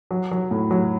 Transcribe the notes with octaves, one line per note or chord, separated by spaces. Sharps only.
F#3
F#3
A2
F#3